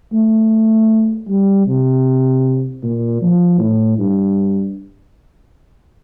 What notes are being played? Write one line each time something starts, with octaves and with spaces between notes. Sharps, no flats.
A3
G3
C3
A#2
F3
A2
G2